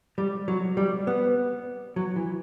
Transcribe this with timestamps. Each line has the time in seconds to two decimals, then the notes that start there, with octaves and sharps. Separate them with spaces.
0.18 G3
0.48 F#3
0.77 G3
1.07 B3
1.96 F#3
2.16 E3